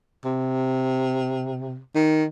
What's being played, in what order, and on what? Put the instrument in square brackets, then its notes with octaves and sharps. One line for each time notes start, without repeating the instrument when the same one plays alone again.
[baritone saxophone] C3
D#3